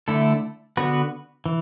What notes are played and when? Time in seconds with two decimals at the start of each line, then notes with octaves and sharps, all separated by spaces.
0.08 D3 A3 E4 A4
0.77 D3 B3 F#4 B4
1.46 E3